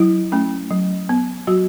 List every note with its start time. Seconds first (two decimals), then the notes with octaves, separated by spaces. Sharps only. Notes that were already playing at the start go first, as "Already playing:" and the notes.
Already playing: F#3 E4
0.32 A3 C#4
0.71 F#3
1.09 B3
1.47 F#3 F#4